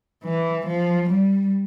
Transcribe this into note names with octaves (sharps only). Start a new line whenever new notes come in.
E3
F3
G3